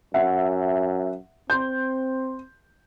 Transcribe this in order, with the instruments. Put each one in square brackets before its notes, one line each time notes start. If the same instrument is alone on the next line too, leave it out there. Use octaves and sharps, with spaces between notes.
[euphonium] F#2 [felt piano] E5 F#5
[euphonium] C4 [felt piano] C6 G6